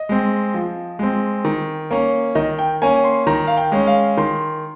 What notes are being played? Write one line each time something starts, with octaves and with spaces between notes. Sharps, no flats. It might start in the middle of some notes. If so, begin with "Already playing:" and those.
Already playing: D#5
G#3 C4
F3
G#3 C4
D#3
A#3 C#4
D#3 D#5
G5
A#3 C#4 G#5
C6
D#3 A#5
F5
G5
G#3 C#4
F5
D#3 C6